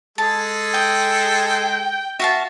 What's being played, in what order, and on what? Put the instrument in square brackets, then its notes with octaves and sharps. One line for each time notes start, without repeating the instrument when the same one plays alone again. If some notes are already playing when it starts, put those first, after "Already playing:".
[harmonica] G#3 G#4 A4 [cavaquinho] A5
[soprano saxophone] G5 [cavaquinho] D#6
[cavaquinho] F#4 F5 A5 [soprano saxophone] E5